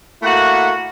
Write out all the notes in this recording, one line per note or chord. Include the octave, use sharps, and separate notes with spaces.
A3 A#3 E4 F#4 F#5